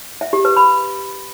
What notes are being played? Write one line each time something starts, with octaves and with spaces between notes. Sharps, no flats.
E5
G4
B4
B5